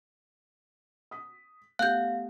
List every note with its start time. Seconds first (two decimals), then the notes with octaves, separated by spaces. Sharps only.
1.11 D#6 B6
1.79 A3 B3 G4 F5 F#6 G6